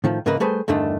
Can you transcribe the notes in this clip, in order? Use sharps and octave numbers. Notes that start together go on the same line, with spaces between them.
A2 D#3 F3
G#2 C#3 E3 A#3 A#4 B4
G3 A3 G#4 B4 C5
E2 G2 D3 D#3 A3 D4